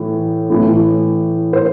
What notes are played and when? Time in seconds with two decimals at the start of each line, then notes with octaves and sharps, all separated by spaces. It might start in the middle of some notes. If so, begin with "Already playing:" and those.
Already playing: A2 E3
0.50 A2 E3
1.53 C5